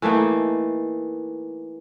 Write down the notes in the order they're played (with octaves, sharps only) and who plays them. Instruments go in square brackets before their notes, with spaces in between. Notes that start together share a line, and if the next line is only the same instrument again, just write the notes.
[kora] E3 A3 A#3 D#4